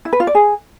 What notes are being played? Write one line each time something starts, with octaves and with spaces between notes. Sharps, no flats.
E4
B4
F4
D5
G#4